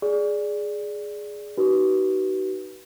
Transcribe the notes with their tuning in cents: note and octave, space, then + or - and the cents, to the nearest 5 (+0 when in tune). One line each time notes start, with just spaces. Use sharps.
G#4 +5 D5 +0
D#4 +0 F#4 +40 B4 -20